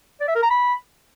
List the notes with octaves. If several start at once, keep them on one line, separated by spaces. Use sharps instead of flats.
D5
E5
A#4
A#5
B5